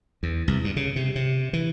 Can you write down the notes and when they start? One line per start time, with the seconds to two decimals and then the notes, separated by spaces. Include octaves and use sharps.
0.23 E2
0.48 C2
0.64 G2
0.76 C#3
0.96 C3
1.15 C3
1.53 E3